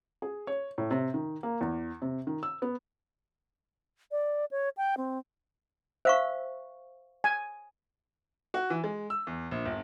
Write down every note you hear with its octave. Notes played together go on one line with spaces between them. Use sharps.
G#4
C#5
A2
C3
D#3
A#3
E2
C3
D#3
E6
B3
D5
C#5
G5
C4
C5 E5 F5 C#6
G#5
F#4
E3
G#3
E6
E2
A#1
G1